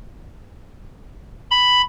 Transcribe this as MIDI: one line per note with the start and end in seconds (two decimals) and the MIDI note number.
1.51 1.82 83